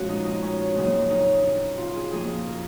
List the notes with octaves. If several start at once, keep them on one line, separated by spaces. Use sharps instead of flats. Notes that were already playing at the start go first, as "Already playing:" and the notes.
Already playing: A#2 F3 G#3 C#4 F#4
D#4
D#4
C#4
F2 C#3 F#3 A#3 D#4
D#4
D#4
F4
G#4
F2 F3 A#3 G#4
A#4